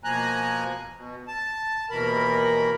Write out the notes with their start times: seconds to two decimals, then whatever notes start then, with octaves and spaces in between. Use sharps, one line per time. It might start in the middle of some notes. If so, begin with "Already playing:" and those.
0.04 B2 F3 A#3 G#5 A#5 F#6
0.95 B2
1.28 A5
1.91 D#2 B2 E3 A#4 B5